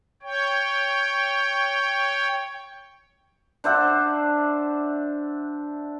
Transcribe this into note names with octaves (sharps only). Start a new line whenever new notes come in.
C#5 G5
D4 C5 E5 F#5